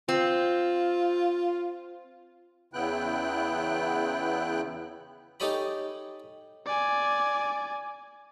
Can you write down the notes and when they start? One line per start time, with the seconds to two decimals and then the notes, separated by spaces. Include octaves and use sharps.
0.09 C4 F4
2.73 E2 C#3 B3 E4 G5 F#6
5.40 D#4 G4 A4 C#5 G#5 B5
6.66 D5 G#5